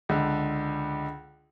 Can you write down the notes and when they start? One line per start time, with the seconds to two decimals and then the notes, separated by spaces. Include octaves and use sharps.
0.09 C#2 D3